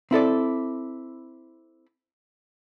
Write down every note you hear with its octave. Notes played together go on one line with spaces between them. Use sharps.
C4 E4 A4 D5